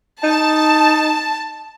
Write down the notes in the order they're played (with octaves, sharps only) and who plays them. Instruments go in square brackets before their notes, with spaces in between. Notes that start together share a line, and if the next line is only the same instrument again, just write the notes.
[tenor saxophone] D#4 [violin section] A5